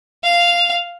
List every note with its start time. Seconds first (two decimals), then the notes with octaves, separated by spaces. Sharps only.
0.23 F5